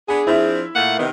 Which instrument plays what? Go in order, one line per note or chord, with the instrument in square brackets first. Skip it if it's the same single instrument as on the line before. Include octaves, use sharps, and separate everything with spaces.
[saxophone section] B3 D4 [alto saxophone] G#4 [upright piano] G#5
[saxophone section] F3 C4 D4 [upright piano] E4 E5
[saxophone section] A#2 A3 A#3 [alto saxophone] F#5
[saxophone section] C3 D#3 [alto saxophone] B3